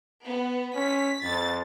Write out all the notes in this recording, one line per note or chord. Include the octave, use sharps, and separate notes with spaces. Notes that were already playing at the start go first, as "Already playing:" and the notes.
B3
C#4 B6
F2 A6